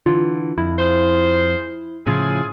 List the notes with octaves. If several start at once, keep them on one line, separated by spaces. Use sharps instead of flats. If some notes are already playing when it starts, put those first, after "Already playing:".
D3 E3 F4
F2 E4
F4 G#4 C5
A2 C#3 F3 E4 F4 G#4